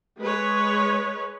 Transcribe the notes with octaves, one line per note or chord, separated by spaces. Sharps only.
G#3 B4 C#5